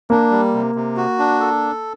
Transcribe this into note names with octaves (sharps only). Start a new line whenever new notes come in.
A#3 D4
G3
C3
C3
F#4
D4
A4